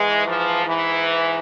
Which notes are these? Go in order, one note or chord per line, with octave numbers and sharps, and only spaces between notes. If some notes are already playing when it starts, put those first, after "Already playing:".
Already playing: G#2 E3 G#3
F3
E3